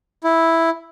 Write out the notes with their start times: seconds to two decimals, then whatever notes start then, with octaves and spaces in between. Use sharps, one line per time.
0.24 E4